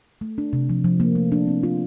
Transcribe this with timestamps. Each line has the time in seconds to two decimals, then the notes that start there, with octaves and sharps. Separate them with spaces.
0.21 A3
0.38 D4
0.53 C3
0.69 F3
0.84 F3
1.00 A#3
1.15 A3
1.32 D4
1.47 C4
1.63 F4